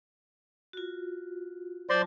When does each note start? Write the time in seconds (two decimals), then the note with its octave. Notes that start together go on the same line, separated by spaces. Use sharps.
0.73 F4 F#4
1.90 F#3 F4 C5 D5 A5 C6